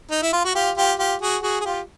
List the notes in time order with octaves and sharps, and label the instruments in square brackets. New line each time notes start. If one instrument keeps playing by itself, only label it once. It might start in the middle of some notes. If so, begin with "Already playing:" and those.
[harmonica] D#4
E4
F4
F#4
F4 G4
F4 G4
F4 G4
F#4 G#4
F#4 G#4
G#4
F4 G4